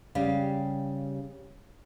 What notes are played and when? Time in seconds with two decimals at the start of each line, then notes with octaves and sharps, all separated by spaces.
0.15 C#3 G3 G4 F5